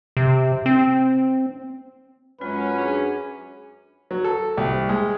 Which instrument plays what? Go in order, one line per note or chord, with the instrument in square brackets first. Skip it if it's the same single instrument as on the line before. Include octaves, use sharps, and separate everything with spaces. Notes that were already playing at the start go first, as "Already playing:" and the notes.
[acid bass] C3
C4
[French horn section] F#2 C#4 [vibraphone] G#3 F4 [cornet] B4
[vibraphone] D4 G#4
[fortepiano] F#3
A4
C2
G#3